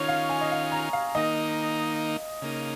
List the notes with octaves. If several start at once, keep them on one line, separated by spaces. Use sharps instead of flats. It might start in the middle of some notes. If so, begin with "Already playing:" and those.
Already playing: D#3 C#4 F4 C#5
F5
G#5
D#5
F5
A#5
F5
D#3 A#3 D#4 D#5
C#3 A#3 D#4